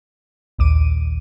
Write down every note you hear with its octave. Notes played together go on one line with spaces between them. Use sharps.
A#1 D#2 D6 D#7